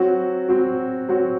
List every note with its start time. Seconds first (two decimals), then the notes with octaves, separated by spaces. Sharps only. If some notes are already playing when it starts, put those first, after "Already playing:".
Already playing: F#3 C4 F#4
0.49 F#3 C4 F#4
1.09 F#3 C4 F#4